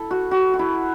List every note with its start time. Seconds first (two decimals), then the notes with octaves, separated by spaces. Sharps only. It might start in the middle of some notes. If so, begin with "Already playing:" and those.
Already playing: E4 A4
0.11 F#4
0.31 F#4
0.54 F#4
0.59 E4